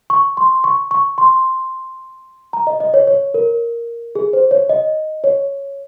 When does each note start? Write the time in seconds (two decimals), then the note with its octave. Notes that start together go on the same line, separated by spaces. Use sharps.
0.10 C#6
0.37 C6
0.64 C#6
0.91 C#6
1.18 C6
2.53 A#5
2.67 D#5
2.80 D#5
2.94 C#5
3.07 C#5
3.34 A#4
4.15 G#4
4.33 C5
4.51 C#5
4.69 D#5
5.24 C#5